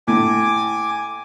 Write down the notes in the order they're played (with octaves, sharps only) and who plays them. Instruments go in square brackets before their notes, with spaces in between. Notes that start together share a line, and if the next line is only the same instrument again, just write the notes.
[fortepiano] A2 [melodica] G#5 D6